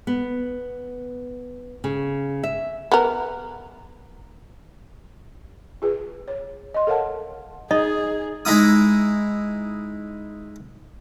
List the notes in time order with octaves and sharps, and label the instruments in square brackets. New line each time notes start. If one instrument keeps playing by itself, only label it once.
[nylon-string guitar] B3
C#3
E5
[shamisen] B3 A#4
[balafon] F4 G#4 B4
C#5
D#5 C6
A4 A#4 C#5 F5 F#5 A5
[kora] D#4 [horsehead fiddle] G#4 [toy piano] D#5
[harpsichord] G#3 D#4 E4 D#6